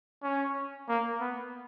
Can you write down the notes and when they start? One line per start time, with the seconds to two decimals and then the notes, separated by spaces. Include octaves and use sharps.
0.23 C#4
0.88 A#3
1.21 B3